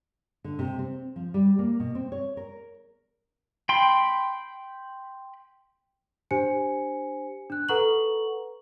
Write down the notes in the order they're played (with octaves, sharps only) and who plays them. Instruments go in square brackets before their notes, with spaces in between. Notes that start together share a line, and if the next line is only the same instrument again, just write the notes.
[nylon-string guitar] D3
C3
C4
F3
G3
A#3
B2
C4
C#5
A#4
[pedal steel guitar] G5 B5 C6
[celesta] D4 G4 C5 G#5 C#7
D4 F#6
A4 B4 F#5 A#5 C#6 F#7